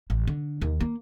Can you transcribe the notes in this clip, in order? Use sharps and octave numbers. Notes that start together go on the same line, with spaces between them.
A1
D3
D#2 D#3
A#3